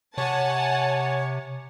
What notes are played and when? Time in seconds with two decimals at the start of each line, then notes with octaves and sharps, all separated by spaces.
0.18 C3 C#5 F#5 G#5 A5